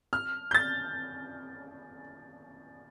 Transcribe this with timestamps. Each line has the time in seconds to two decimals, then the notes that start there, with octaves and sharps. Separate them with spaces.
0.13 F6
0.51 G6
0.54 A6